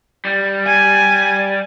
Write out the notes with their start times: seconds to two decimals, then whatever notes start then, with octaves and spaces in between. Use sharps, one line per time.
0.25 G3
0.66 G#5